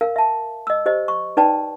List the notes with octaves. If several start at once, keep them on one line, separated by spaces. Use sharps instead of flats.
A#4 F5
E5 A5
D#5 E6
G4 C5 D#5
C#6
D#4 B4 D5 G5 A5